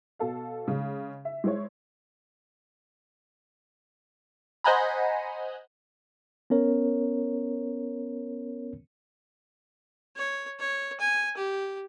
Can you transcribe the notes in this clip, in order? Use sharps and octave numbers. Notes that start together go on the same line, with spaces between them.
B2 A4 F5
C#3 G#3
E5
G#3 E4 C5 C#5
C5 D#5 F#5 G#5 A#5 B5
B3 C#4 A#4 C#5
C#5
C#5
G#5
G4